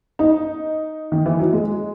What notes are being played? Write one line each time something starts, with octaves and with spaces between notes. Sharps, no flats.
D#4
D#3
E3
F#3
G#3